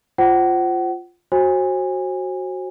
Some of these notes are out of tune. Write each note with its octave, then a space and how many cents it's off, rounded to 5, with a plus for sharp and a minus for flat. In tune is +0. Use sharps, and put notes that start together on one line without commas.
F4 +0 C5 +0 F#5 +35
F#4 +0 C5 +35 G#5 -25